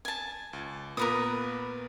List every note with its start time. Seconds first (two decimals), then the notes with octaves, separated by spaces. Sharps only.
0.05 G#5 A5
0.53 C#2
0.97 A#2 A#3 B3 A#4 B4 D#6